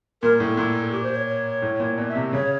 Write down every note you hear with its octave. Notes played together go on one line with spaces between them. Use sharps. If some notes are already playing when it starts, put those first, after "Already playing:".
A#2 A#4
A2
A4
A#2
G4
C5
C#5
C#5
A2
A#2
B2 D5
E5
C3
C#3 C#5